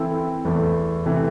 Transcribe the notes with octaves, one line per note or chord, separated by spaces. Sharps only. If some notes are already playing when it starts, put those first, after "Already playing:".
Already playing: E3 C4 E4 A4
E2 E3 A3
C3 E3 A3